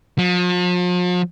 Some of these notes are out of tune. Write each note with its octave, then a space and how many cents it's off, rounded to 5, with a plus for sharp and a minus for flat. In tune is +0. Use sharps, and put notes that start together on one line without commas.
F3 +40